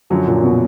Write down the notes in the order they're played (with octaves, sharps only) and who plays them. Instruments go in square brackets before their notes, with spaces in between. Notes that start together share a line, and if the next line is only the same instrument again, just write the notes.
[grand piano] F#2 D3 F#3 [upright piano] F3
[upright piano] A#2
B2